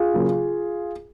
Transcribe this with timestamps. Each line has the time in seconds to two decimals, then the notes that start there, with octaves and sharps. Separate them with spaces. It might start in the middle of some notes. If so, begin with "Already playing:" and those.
Already playing: F4 G#4
0.14 C#3 F#3 A#3